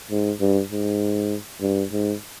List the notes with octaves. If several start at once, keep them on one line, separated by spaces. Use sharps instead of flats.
G#2
G2
G#2
G2
G#2